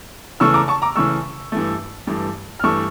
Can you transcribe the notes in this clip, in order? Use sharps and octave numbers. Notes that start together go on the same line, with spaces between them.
C#3 E3 A3 C#6 E6
A#5 D6
A5 C#6
A#5 D6
C#3 E3 A3 C#6 E6
G2 E3 A3
G2 E3 A3
F6
G2 E3 A3 C#6 E6